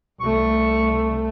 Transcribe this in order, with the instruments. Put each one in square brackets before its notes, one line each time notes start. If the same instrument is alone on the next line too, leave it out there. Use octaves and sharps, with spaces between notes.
[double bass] C2 A3 [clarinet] C#6